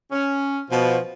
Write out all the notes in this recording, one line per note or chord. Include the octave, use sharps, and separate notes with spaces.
C#4
B2 F3